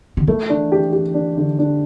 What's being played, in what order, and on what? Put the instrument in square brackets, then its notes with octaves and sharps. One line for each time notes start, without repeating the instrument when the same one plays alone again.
[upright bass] D3
[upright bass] E3 [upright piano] A3
[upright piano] D4
G4
G4
D4
D3
D4